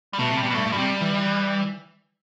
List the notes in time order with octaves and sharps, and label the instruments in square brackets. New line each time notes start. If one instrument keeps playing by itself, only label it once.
[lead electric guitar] G3
[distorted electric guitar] B2 [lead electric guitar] A3
[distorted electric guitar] C3
[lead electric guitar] G3
[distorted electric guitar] B2
[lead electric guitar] G3
[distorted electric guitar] G2 [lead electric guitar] A3
[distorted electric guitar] A2
[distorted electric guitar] B2 [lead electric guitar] G3
[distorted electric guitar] C3
E3
E3